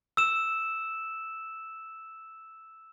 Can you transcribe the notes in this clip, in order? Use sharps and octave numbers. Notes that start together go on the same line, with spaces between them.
E6 E7